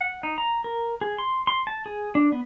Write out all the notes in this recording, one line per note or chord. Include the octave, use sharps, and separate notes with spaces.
F#5
D#4
A#5
A#4
G#4
C6
C6
A5
G#4
D4
B3